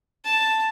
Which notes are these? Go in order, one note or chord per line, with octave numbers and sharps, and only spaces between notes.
A5